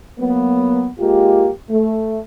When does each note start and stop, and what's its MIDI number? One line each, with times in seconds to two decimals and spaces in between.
0.19 0.88 54
0.19 0.88 58
0.19 0.88 59
0.99 1.49 56
0.99 1.49 58
0.99 1.49 65
0.99 1.49 67
1.70 2.20 57